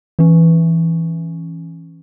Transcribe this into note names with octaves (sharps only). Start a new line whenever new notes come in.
E3 C#4